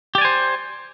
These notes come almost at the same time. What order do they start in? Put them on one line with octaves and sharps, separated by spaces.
G4 D5 G#5 C5